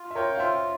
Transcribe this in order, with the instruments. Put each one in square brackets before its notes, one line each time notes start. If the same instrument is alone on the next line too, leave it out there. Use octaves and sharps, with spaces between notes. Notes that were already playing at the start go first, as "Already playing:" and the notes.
Already playing: [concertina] F4
[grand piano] E5
[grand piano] A#4 C#5 [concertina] G5
[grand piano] F5
[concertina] F4 [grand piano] C5 E5